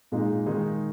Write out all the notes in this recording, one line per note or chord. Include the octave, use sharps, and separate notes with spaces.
A#2 G#3 D#4
D#3 G#3 D#4 G#4